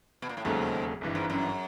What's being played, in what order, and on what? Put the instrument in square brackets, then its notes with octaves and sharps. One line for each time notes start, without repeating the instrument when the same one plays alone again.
[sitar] B2
A#2
A2
[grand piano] E1 D#2 C#3 F#3 A3 [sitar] G#2
[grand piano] G#1 G2 E3
[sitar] G#2
F#2